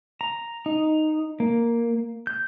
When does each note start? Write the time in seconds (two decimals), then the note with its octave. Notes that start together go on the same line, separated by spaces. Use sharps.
0.21 A#5
0.66 D#4
1.40 A#3
2.27 G6